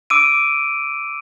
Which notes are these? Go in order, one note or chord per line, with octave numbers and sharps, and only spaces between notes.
D6 E6 D7 D#7